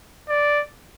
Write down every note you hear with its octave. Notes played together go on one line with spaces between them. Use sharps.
D5